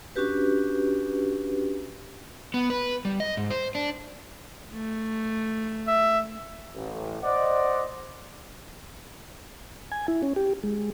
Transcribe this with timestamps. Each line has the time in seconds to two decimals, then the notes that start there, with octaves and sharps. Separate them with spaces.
0.16 C#4 D4 F#4 G4 B4
2.54 B3
2.70 B4
3.05 G3
3.20 D#5
3.37 G#2
3.51 C5
3.75 D4
4.73 A3
5.88 E5
6.75 A1
7.23 C5 D5 D#5 F#5
9.92 G#5
10.08 E4
10.23 C#4
10.36 G4
10.63 G#3